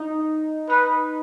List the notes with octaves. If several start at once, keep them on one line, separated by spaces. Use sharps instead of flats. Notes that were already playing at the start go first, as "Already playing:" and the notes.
Already playing: D#4
D#4 B4